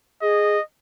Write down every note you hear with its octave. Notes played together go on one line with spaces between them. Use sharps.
G#4 D#5